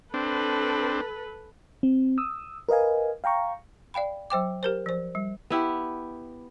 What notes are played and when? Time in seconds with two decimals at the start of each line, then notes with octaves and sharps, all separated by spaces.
0.14 C4 D4 A4 B4
1.83 C4
2.18 D#6 E6
2.69 A#4 B4 D#5 F5 G#5
3.24 F5 G5 A#5 C#6
3.94 D5 F5 G5 B5
4.30 F#3 C5 G5 D6
4.63 G4 A#4 C5
4.86 F3 C5
5.15 G3
5.50 B3 E4 G4